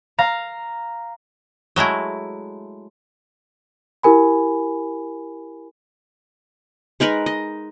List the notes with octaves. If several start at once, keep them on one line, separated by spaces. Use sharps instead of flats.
F5 A#5
F#3 G#3 A3 E4
E4 G4 A#4 G#5 B5
G#3 D#4 A#4 B4
D#5